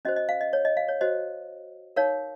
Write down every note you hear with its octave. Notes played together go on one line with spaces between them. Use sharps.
C#4 F#4 C5 D#5
D#5
F5
D#5
C#5
D#5
F5
C#5
F#4 C5 D#5
D#4 A#4 C#5 F5